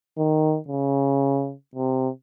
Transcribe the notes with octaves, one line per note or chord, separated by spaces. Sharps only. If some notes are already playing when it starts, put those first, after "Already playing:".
D#3
C#3
C3